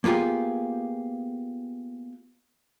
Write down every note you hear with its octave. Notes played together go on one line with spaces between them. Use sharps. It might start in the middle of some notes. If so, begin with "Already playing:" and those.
A#3 B3 F4 G4 G#4